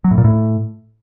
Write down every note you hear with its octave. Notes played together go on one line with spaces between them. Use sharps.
F#3
A2
A#2
A2